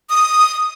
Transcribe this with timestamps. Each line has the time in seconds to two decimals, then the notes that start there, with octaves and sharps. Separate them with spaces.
0.10 D#6